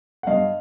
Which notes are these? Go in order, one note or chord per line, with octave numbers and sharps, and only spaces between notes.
F#5
G2 D#5 F5